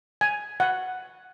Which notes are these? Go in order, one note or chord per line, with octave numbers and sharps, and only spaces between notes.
G#5
F#5